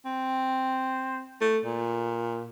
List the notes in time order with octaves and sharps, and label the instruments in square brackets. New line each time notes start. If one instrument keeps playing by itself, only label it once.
[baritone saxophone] C4
A3
A#2